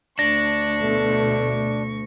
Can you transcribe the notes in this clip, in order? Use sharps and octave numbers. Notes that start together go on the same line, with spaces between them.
D2 D4 C#6 A#6
B2 A3